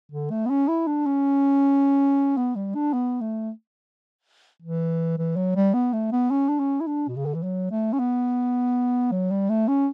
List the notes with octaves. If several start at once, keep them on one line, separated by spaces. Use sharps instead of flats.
D3
A3
B3
C#4
E4
D4
C#4
B3
G3
D4
B3
A3
E3
E3
F#3
G3
B3
A3
B3
C#4
D4
C#4
E4
D4
B2
C#3
D3
E3
F#3
A3
C#4
B3
F#3
G3
A3
C#4